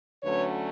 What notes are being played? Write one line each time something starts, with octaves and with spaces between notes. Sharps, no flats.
D2 D3 F#3 A3 C#4 B4 C#5